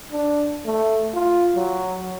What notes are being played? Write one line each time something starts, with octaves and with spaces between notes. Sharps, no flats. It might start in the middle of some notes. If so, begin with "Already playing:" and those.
D4
A3
F4
F#3